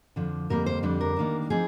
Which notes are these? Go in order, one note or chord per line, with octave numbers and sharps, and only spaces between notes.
F2 D3 F3
F2 D3 G3 A#3 A#4
C5
F2 D3 G3 D4
A#4
D#3 A#3 D4
F3 C4 D#4 G#4